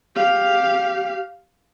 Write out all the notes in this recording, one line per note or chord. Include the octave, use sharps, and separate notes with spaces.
G4 F5